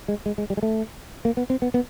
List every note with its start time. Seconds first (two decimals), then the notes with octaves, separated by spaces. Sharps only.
0.08 G#3
0.26 G#3
0.38 G#3
0.50 G3
0.57 G#3
0.63 A3
1.25 A#3
1.37 B3
1.50 C4
1.62 B3
1.74 B3